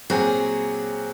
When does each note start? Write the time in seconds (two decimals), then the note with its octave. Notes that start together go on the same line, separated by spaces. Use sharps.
0.10 A#2 F#3 C4 F#4 G#4